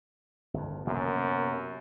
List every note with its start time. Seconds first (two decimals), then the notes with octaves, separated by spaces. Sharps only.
0.54 G1 F2
0.87 F#2 C3 A#3 B3